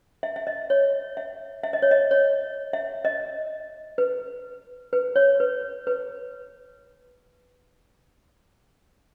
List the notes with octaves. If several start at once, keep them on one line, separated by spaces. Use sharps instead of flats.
E5
E5
D#5
C#5
E5
E5
D#5
C#5
D#5
C#5
E5
D#5
B4
B4
C#5
B4
B4